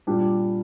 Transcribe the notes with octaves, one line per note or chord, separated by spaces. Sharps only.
A#2 G3 D4